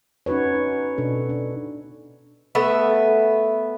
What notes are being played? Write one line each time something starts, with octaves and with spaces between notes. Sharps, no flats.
C#4 D#4 F#4 B4 C#5
D#4
B2 D4 A4
D4
A3 B3 B4 E5